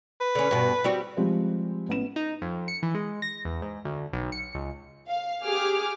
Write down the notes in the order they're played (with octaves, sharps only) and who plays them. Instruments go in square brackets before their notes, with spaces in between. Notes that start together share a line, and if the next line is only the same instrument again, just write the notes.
[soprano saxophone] B4
[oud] D3 C#4
G2 B2
G3 C4 F#4
[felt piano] F3 G3 G#3 C4
A1 B3 E7
[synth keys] D#4
F2
C#7
E3
G#3
A#6
E2
G#2
D2
B1
C#7
C#2
[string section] F5
G4 G#4 D6 F6